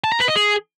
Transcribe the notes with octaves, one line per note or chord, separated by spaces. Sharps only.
A5
A#5
B4
D#5
G#4